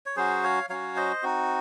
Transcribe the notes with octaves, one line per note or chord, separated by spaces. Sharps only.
C#5
F#3 C#4 F#4 G#4 C5
C#5 F5
F#3 C#4 F#4 C#5 F5
C5 D#5
C4 D#4 F#4